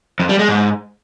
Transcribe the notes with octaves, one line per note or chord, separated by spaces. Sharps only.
F2
G3
G#3
G#2